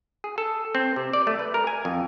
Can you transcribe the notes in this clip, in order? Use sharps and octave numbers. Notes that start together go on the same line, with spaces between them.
G#4
A4
C4
C3
D5
A3
B4
A#4
G#5
F2